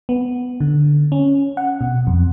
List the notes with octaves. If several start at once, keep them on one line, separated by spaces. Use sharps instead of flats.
B3
D3
C#4
F#5
B2
F2